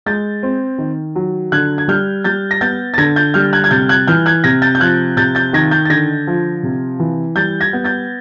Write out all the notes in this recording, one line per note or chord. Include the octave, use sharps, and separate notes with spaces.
G#3 G6 A6
C4
D#3
F#3
D3 F#6 G#6
G#6
G3 F6 G6
G3 G6 A6
A#6
B3 G6 A6
A6
D3 G#6 A#6
G6 A6
G3 F6 G6
F#6 G#6
G#6
C3 G6 A6
F#6 G#6
E3 F6 G6
F#6 G#6
C3 G#6 A#6
G6 A6
G6
F3 F#6 G#6
C3 G6 A6
G6 A6
D#3 G#6 A#6
G6 A6
A6
D3 G#6 A#6
F3
C3
E3
G3 G6 A6
G#6 A#6
B3
G6 A6